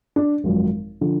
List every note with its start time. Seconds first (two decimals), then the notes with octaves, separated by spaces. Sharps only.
0.16 D4
0.44 G#1 F#2 F3
1.01 D3 F3